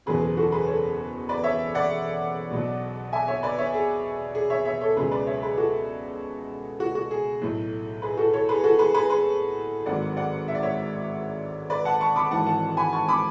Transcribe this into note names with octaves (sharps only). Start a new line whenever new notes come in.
F#1 E2 B2 F#3 G#4 B4
G#4
F#4 A4
G#4 B4
A4 C#5
B4 D5
C#5 E5
D5 F#5
B1 B2 F#3
E5 G#5
C#5 E5
B4 D5
C#5 E5
G#4
G#4
C#5 E5
C#5 E5
A4 C#5
C#2 B2 F#3 G#4 B4
B4 D5
C#5 E5
G#4 B4
F#4 A4
F#4
F#4
G#4
B1 A2 F#3
G#4 B4
F#4 A4
A4 C#5
G#4 B4
F#4 A4
G#4 B4
G#4 B4
G#4 B4
G#1 G#2 F#3 D5 F#5
D5 F#5
E5
D5
C#5 E5
B4 D5
F#5 A5
A5 C#6
B5 D6
G#1 G#2 E3 F#5 A5
F#5 A5
G#5 B5
A5 C#6
B5 D6